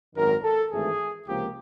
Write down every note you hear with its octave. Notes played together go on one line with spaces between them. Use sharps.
G#1 F#2 D#3 A#4
A4
G#1 G2 E3 A3 G#4
C#2 C3 F3 A#3 G4